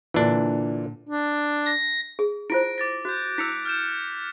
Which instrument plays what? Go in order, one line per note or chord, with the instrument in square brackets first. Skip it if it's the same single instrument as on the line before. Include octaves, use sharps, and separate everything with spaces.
[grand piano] A#2 D3 [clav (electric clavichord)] E3 D4
[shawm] D4
[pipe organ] A#6
[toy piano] G#4
[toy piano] E4 F4 C5 [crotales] A#6 D7
[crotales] D6 A6 A#6
[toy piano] F#4 [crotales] F#6 G6
[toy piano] E4 E6 [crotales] B6 C#7 F7
[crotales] F6 G6 E7